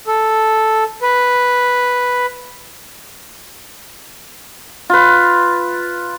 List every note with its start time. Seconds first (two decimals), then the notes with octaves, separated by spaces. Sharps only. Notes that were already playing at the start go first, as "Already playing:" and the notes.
0.07 A4
1.02 B4
4.90 F4 B4